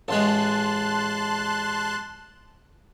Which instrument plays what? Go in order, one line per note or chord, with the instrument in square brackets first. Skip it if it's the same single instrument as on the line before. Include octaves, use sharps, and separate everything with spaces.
[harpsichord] A1 G#3 [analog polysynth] A5 C6 F#6